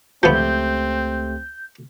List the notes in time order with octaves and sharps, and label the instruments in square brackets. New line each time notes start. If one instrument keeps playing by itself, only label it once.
[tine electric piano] C#2 A3 G4 [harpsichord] F3 B3 [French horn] C4 [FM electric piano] G6